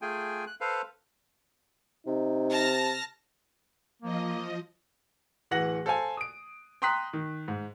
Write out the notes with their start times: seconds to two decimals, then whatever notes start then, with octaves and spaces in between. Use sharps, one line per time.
0.02 A3 F4 G#4 G5 G#5
0.47 F#6
0.61 A4 B4 C5 F5
2.07 C3 D#4
2.50 A5 F6 A#6
4.02 F3 A#3 D#5
5.51 D1 E3 F#5 A#6 F#7
5.86 A4 C5 F5 G#5
6.17 D#6 D7
6.82 G5 A#5 C6 D#6 F#6 B6
7.13 D#3
7.48 G#2